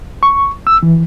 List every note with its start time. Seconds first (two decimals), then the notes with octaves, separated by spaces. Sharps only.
0.23 C#6
0.67 E6
0.83 E3